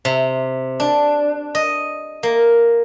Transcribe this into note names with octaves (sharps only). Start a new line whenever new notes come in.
C3
D4
D#5
A#3